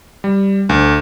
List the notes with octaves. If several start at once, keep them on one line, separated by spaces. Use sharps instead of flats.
G3
D2